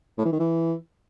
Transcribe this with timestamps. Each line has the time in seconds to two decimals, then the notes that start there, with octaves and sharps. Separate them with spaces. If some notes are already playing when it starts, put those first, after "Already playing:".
0.18 A2
0.25 E3
0.32 D#3
0.39 E3